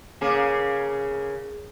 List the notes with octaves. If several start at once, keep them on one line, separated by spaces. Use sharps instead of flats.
C#3 A#3 G#4